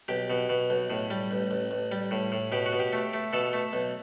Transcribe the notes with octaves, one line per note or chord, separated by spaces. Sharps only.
B1 G4
B2
B2
B1
A2
G3
A1
A1
A1
G3
A2
A2
B2 G4
F#4
B2
G4
A3
A3
B2 A4
A3
B1